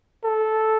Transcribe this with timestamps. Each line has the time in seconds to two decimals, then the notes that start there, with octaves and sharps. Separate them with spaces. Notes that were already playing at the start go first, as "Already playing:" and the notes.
0.24 A4